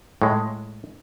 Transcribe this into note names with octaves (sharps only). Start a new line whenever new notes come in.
A2 G#3